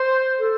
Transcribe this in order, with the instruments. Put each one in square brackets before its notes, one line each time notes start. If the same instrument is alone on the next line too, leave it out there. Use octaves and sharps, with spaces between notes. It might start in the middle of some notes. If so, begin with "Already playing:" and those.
Already playing: [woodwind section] C5
A4